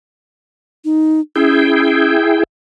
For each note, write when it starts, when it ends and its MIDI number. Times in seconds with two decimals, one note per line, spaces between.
0.85 1.20 63
1.36 2.15 61
1.36 2.43 64
1.36 2.43 68
1.36 2.43 79